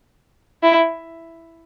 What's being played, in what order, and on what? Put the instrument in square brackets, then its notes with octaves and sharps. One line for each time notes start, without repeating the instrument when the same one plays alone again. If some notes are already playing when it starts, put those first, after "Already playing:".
[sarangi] E4